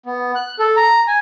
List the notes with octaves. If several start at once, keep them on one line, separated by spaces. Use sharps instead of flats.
B3
F#6
A4
A#5
G#5